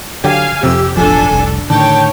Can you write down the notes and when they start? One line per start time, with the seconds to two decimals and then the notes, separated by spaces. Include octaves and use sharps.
0.24 D3 F#3 G4 F5 G#5
0.63 F2 C3 G4 E6
0.97 E1 A1 F3 D4 A4 G#5
1.31 F1 C2
1.70 A2 D3 D#3 D4 C#5 G5 A5